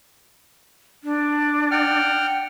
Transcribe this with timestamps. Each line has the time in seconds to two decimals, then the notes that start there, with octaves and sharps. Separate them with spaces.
1.04 D4
1.71 F#5 G5 F6